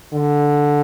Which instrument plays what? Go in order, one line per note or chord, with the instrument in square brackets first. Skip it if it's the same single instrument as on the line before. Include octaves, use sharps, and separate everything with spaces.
[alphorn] D3